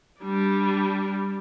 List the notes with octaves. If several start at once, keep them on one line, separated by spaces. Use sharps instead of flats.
G3 D4